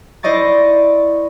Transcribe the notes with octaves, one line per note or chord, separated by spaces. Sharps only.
E4 C5 D5 D#5 C#6 A6